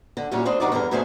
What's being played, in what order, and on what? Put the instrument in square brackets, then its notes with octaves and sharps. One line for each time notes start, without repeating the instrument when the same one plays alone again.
[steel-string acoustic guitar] D3
A#2 F#3 G3 C#4 E4 F#4
A3 C4 D4 C5 D#5
G2 D#3 D4 D#4 F#4 D5
E2 G2 D3 E3 A#4
G#2 B2 D3 A3 C5 G#5